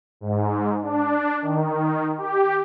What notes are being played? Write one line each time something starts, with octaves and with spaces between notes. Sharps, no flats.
G#2
D4
D#3
G4